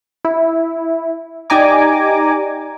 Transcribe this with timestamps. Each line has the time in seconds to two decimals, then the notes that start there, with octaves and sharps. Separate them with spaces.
0.25 E4
1.50 D#4 G4 D5 G#5 A#5 D6